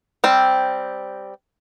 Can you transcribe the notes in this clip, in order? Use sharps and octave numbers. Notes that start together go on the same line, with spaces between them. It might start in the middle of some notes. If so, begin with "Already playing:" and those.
G3 C4